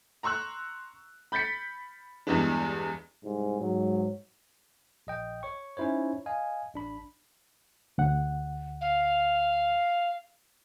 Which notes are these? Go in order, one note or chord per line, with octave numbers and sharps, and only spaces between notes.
A#5 C6 C#6 E6 F#6
B5 G6 A6 B6 C#7
E2 G2 E3 G#3 B3 D4
C2 G#2
G#2 F#3
A#1 D#5 G5
C#5 C#6
C#4 D#4 E4 C5 C#5
D#5 F5 G#5
A1 D4 B5
D2 F#5
F5